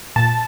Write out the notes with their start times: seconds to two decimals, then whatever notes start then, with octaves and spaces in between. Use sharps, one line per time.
0.16 A#2 A5